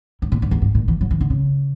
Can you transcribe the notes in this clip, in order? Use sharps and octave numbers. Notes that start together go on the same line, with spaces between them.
G2
A#2
G2
E2
G2
A#2
E3
F#3
E3
D3
C#3